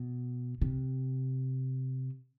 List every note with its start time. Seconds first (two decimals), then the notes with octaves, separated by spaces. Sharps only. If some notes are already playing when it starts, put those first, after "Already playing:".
Already playing: B2
0.61 C3